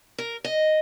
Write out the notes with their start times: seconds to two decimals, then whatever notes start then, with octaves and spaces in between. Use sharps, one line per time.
0.18 A#4
0.44 D#5